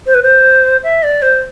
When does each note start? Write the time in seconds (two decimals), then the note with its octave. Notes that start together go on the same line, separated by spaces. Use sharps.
0.07 C5
0.14 B4
0.23 C5
0.84 E5
1.03 D5
1.22 C5